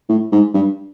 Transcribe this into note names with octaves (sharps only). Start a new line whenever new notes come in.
A2
G#2
G2